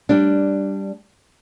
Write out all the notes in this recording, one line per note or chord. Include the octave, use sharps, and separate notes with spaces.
G3 D4